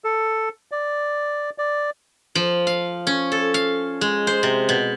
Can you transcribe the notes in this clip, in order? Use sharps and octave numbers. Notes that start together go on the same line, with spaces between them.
A4
D5
D5
F3
F5
C#4
A4
F5
G#3
C5
C3
B2